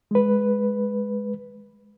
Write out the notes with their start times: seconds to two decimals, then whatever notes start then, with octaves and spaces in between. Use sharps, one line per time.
0.11 G#3 B4